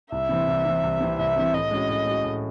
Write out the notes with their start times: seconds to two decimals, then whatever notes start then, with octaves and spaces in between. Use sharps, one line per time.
0.12 C2 E5
0.29 C3 E3 C4
0.48 C2
0.66 C3 E3 C4
0.83 C2
1.00 C3 E3 C4
1.18 C2 E5
1.36 C3 E3 C4
1.53 A2 D#5
1.71 G#3 C#4 F#4
1.89 A2
2.06 G#3 C#4 F#4
2.24 A2